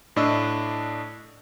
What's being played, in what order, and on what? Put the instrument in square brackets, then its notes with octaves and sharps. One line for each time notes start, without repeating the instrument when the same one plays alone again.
[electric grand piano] A2 D4 D#5 E6